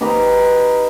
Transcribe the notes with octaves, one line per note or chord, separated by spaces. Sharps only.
D#4 G4 B4 A#5